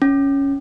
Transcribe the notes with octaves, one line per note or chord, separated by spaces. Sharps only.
C#4